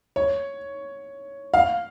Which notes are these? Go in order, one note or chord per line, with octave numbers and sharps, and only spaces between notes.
C#5
F5